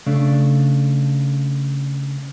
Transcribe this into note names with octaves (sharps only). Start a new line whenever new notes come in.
C#3 A3 D4